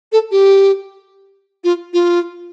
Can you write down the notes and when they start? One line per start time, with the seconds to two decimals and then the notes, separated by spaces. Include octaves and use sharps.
0.12 A4
0.31 G4
1.64 F4
1.93 F4